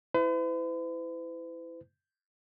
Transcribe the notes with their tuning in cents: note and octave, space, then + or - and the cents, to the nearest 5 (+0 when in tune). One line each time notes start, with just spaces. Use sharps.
E4 +0 B4 +45